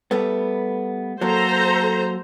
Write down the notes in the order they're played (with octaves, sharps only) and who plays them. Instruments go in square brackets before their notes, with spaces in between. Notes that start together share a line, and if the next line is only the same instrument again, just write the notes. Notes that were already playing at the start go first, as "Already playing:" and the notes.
[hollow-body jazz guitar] G3 A3 B3
[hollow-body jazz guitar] F#3 A3 A#3 [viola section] A4 C5 A#5